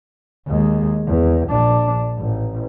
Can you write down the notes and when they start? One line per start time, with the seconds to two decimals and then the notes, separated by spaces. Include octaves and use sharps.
0.48 D#2 G#3
1.08 E2
1.49 A#1 D4
2.18 A1